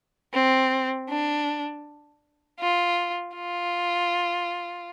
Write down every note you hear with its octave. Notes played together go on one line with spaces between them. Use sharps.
C4
D4
F4
F4